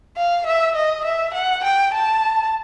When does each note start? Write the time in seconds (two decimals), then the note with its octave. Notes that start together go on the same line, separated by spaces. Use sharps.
0.17 F5
0.46 E5
0.75 D#5
1.05 E5
1.34 F#5
1.64 G5
1.94 A5